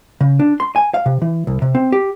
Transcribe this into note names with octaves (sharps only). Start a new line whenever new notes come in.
C#3
D4
C6
G#5
F5
C3
E3
C2
C3
C4
G4